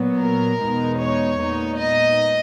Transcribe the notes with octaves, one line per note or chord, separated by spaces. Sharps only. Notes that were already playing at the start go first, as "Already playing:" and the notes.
Already playing: A#2 F#3 B3
A#4
E2 B2 G#3 B3 D#4
C#5
A#2 G#3 B3 D#4
D#5